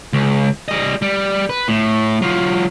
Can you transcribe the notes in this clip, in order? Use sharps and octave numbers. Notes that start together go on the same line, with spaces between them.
C#2
G3 D#5
G3
B4
A2
F#3 F4